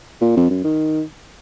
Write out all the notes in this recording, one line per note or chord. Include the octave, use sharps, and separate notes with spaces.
A#2
F2
F#2
D#3